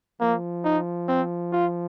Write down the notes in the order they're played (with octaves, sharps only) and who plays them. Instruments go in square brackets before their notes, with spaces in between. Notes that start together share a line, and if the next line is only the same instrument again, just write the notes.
[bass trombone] F3 [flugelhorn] A#3
[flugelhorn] D#4
C4
F4